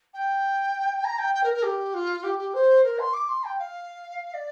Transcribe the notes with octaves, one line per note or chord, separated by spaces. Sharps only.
G5
A#5
G5
G5
A#4
A#4
G4
F4
G4
G4
C5
A#4
C6
D6
C6
G5
F5
D5